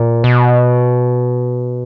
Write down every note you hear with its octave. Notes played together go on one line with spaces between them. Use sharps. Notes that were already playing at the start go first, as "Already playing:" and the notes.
Already playing: A#2
B2